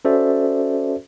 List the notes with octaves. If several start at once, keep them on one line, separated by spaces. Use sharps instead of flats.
C#4 F#4 A4 C5 D5 E5